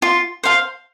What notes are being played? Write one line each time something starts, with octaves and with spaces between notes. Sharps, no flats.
F4
C5 F5 C6